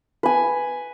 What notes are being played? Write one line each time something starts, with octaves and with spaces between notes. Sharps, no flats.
B4 G#5